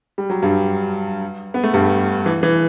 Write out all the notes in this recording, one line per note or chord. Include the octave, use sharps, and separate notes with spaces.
G3
F#3
G2 G3
B3
A3
G2 G3
E3
E3